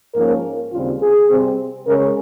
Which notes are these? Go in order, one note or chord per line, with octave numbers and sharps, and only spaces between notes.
G#2 F3 A#3 C#4 A#4
D#2 C#3 G3 C4 F4
G#4
C3 G3 C4
C#3 G#3 C#4 A#4